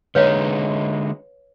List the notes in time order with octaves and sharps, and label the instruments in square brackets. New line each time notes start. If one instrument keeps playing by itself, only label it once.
[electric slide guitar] D3 G#3 D#4 [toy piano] B4 C#5 F5